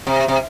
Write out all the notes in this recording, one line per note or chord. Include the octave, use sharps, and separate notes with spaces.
C3
C3